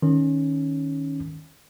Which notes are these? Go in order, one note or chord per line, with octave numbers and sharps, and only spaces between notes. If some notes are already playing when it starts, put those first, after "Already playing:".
D#3 C#4